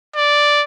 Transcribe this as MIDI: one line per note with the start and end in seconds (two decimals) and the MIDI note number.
0.16 0.64 74